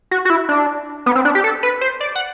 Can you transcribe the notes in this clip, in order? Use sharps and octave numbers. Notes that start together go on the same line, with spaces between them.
F#4
F#4
E4
D4
B3
C4
D4
G4
A4
B4
C5
D5
F#5